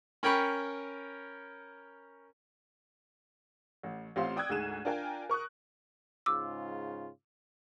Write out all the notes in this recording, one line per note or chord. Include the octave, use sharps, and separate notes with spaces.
C#4 A#4 G5 B5 C#6
A1
A1 C4 F4 G4 F5 C6
D5 G5 D#6 E6 F#6 G#6
D2 G#2 G#4 D#7 E7
D4 F4 A#4 G5 G#5
A#4 C#6 D#6 F#6
G#2 C#3 F4 D6 E6